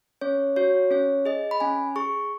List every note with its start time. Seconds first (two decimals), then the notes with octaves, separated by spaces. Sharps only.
0.21 C#4 C#5
0.56 F#4 C#5
0.91 C#4 C#5
1.26 G#4 D#5
1.51 B5
1.60 C#4 G#5
1.96 G#4 C#6